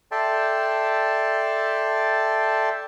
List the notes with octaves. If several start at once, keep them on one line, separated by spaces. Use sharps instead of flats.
A4 D5 E5 G5 A5 C6